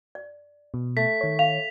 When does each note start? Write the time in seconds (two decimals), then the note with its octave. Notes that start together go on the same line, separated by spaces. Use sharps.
0.15 D5
0.74 B2
0.97 A3 B6
1.21 D#3 C#5
1.39 F5 F7